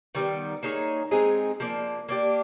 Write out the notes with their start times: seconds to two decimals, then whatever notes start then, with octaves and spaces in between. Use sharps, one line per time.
0.15 D#3 G3 B3
0.63 A#3 D#4 G#4 C#5
1.11 G#3 C4 D#4 G#4
1.60 F3 A#3 D4
2.09 A#3 D4 G4